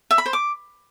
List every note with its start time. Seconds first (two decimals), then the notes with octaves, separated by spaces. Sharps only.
0.11 E5
0.18 B5
0.26 C5
0.33 D6